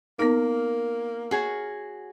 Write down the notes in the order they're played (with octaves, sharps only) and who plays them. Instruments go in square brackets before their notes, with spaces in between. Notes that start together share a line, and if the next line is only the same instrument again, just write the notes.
[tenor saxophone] A#3 [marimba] B3 D#4 [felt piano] A#4
[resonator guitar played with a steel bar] F#4 G#4 C#5